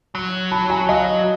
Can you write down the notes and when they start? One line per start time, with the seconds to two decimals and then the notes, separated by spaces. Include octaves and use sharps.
0.15 F#3
0.52 A5 B5
0.70 G#5 A#5
0.89 F#3 D#5 F5